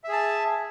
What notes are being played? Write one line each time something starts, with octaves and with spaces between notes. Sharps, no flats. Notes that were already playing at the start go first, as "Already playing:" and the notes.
G#4 E5 A5